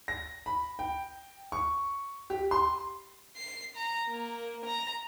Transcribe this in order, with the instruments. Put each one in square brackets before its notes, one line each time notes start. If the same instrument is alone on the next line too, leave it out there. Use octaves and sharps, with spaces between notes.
[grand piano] A#6
B5
G5
C#6
G4
C6
[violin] C7
A#5
A#3
A#5